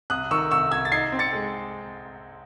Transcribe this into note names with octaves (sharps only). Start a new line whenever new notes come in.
C2 D#6 F#6
D#3 C#6 E6
C2 C#6 E6
C2 E6 G#6
A6
D#4 G#6 C7
C4
A6 C#7
G#3